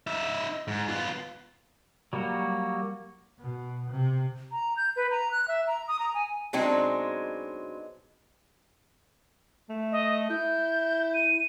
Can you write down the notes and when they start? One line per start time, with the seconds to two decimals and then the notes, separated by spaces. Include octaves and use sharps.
0.07 D#4 E5
0.68 G#2
0.88 B3 F4
2.13 F#3 G3 A#3 F#4
3.39 B2
3.91 C3
4.52 A#5
4.77 G6
4.96 B4
5.11 A#5
5.32 F#6
5.48 E5
5.67 A#5
5.88 D#6
5.99 A#5
6.14 G#5
6.53 B2 F#3 G#3 C4 D4 D#4
9.69 A3
9.92 D#5
10.30 E4 G6
11.14 D#7